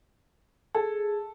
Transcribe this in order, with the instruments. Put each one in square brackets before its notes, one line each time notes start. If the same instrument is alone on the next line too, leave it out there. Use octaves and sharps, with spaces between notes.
[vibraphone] G#4 [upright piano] A4